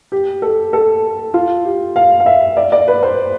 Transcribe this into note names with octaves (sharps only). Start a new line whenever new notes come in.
G4
A4
A4
F4
G4
F5
F5
E5
D5
D5
B4
C5